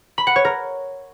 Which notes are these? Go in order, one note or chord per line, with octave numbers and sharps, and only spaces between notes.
B5
F#5
C#5
A#4